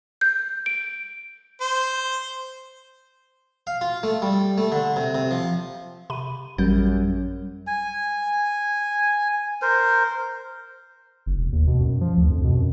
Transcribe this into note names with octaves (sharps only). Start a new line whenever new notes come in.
G6
D7
C5
F5
F4
A3
G3
A3
D3
C3
C3
F3
C3 B5 D#7
A1 F#2 G3 G6
G#5
A#4 C5
F#1
E1
D#2
B2
F#2
F3
D2
F2
B2
F#2